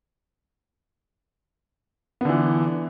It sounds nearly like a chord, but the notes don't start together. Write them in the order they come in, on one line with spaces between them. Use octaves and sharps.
B3 D3 E3